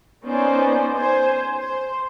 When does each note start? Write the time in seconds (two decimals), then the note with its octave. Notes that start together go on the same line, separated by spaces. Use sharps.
0.24 B3 C#4 D#4 C5 D5
0.95 C5 G#5
1.56 C5